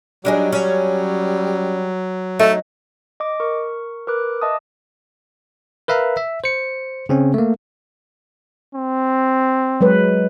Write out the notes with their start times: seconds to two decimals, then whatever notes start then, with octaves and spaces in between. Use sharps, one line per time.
0.25 F#3 G3 D4 D#4 G#4
0.53 C#4
2.39 A3 D#4
3.20 D#5 D6
3.40 A#4 C#6
4.07 A#4 B4 D6 F#6
4.41 D#5 E5 A5 D6 D#6
5.88 A#4 B4 E5 F5 A#5
6.17 E5
6.44 C5 C#7
7.09 C#3 C4 C#4
7.34 A3 A#3
8.75 C4
9.81 F#3 G#3 B4